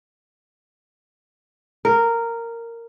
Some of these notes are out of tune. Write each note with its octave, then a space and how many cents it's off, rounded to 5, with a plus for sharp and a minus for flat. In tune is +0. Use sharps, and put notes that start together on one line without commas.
A#4 -10